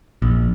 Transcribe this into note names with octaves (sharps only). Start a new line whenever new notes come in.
A#1